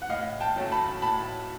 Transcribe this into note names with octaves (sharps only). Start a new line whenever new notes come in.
F#5
A2 D#5 F5
G5 A5
F#3 A3 C#4
A5 B5
A2 A5 B5